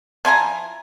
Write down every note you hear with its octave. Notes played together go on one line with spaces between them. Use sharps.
F3 E4 G#5 A#5